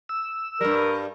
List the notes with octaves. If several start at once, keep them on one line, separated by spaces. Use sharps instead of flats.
E6
G2 G3 A#4